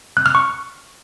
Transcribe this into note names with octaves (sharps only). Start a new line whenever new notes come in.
F#6
F6
C#6